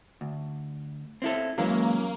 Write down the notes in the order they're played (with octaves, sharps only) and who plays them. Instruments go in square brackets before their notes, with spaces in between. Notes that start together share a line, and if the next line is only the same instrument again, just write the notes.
[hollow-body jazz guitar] D2
C4 E4 A4
[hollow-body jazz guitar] E3 G#3 [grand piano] F#3 C#4 [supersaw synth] A#3